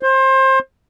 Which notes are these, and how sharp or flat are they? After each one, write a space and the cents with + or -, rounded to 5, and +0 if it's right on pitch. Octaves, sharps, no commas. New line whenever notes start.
C5 +25